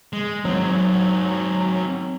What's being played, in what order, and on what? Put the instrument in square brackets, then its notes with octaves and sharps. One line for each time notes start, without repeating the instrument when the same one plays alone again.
[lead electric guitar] G#3
[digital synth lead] F#3 [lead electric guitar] C4 D#4